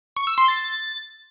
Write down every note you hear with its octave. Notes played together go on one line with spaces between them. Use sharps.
C#6
E6
C6
A6